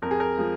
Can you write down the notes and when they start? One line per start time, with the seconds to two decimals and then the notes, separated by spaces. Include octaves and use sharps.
0.02 F2 A#4
0.11 G#4
0.20 A#4
0.37 F3 G#3